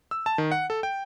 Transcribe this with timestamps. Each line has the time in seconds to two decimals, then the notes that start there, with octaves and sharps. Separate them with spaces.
0.11 E6
0.26 A5
0.38 D#3
0.51 F#5
0.70 A4
0.83 G5